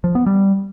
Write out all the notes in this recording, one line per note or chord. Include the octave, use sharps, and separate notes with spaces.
F3
B3
G3